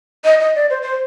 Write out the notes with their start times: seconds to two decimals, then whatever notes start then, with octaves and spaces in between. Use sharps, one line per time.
0.25 D#5
0.40 D#5
0.55 D5
0.70 C5
0.82 C5